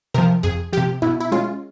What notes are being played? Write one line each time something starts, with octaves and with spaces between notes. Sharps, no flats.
C3 F3 A#4
F2 G#4
C3 F3 G4
B2 E4
E4
G#3 C#4 F4